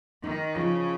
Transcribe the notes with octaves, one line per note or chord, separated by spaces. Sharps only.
D#3 D#4
C#3 F3